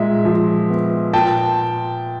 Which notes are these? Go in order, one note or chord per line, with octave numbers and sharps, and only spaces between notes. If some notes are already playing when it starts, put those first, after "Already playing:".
Already playing: A#2 G#3 E5
F3
B3
A#2 G5 A5